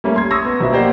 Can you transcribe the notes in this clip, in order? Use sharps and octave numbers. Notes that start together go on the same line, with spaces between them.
G3 A3 A#3 C#4
C6 G#6
C#6 D#6 E6 G#6 A#6
B3
A#1 B2 E5
A#3 G4 C5 D5 F#5